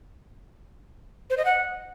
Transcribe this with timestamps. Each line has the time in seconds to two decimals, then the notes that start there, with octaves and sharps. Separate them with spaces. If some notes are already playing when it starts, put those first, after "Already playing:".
1.30 C5
1.38 D#5
1.45 F#5